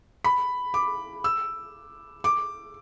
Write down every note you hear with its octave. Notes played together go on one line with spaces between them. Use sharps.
B5
D6
E6
D6